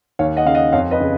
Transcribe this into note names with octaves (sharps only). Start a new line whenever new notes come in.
D#2 C#5 F5
D#5 F#5
C#3 F5
D#5 F#5
F2 C#5 F5
B4 D#5
C#3